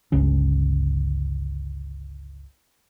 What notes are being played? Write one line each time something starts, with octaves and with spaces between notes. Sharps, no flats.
G1 C#2 C#4